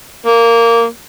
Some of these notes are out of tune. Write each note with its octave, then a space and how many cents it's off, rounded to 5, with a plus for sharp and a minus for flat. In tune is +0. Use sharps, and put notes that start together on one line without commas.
A#3 -10